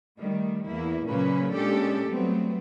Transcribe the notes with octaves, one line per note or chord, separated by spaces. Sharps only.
D#3 G3 A3
E2 A#3 E4
A#2 C#3 F#3 A#3 C#4 B4
A#2 G#3 C#4 D4 G4 A4
F#3 G3 A3 B3 C4